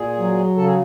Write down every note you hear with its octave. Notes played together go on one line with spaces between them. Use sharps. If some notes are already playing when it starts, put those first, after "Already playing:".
Already playing: A#2 G#4
F#3
C#3 A4
G#4